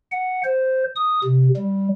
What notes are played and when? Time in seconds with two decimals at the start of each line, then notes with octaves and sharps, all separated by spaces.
0.12 F#5
0.44 C5
0.96 D#6
1.24 C3
1.56 G3